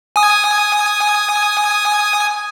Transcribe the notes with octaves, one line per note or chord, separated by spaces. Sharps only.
G#5 D#6